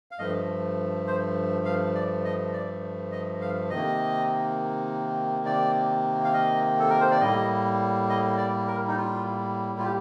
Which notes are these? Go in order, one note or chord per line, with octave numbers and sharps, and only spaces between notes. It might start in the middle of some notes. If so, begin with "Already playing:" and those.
F5
G2 F3 A3 D#5
C5
F5
D5
D#5
D5
D#5
F5
C3 D#3 A#3 D#5
D5
F5
D#5
A4
A#4
C5
D5
A2 G3 A#3 D#5
D#5
D5
A#4
D#4
F4
F4
G4